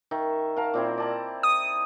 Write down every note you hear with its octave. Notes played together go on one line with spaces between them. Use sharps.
D#3 E5 C#6
A#4 F5 A5
A#2 C4 E4
D5 A5 A#5
D#6